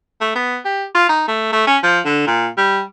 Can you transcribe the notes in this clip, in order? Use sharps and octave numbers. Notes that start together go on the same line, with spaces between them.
A3
B3
G4
F4
D#4
A3
A3
C#4
F3
D3
A#2
G3